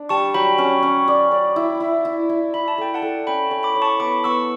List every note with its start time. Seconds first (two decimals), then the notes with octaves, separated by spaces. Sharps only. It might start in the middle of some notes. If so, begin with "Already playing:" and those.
Already playing: D4
0.09 G3 A5 C#6
0.34 F#3 G5 B5
0.58 C#4
0.83 C#4
1.08 D5
1.31 D5
1.56 E4
1.80 E4
2.05 E4
2.29 E4
2.54 E4 B5
2.68 A5
2.78 A4 G5
2.94 F#5 A5
3.02 A4
3.27 C#4 G5 B5
3.51 C#5
3.63 B5 D6
3.76 C#5
3.82 A5 C#6
4.00 B3 B5 D6
4.24 B3 C#6 E6